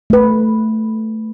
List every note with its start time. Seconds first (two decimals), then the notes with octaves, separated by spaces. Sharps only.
0.10 A3 B4